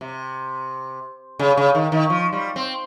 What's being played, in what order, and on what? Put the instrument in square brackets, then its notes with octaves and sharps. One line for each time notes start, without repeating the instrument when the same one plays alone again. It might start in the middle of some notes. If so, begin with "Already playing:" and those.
[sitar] C3
C#3
C#3
D#3
D#3
F3
G3
C4